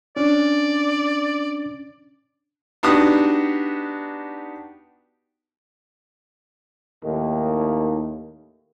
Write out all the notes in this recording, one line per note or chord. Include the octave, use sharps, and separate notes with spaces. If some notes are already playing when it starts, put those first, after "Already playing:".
C#4 D4 D5
B3 D4 D#4 F#4 G4 D#6
D#2 A2 D#3